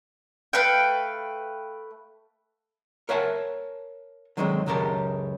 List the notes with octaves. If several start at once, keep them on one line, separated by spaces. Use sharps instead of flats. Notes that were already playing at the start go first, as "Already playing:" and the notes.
A3 B4 F5 G5
A#4 C#5 E5 F#5 G#5 A5
D3 D#3 F#3 G#3 A3 C4
C#2 F#2 C#3 G4 A#4 A5